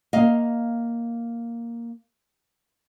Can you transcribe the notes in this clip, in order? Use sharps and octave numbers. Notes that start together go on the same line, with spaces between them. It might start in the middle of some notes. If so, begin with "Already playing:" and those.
A#3 D#5 F5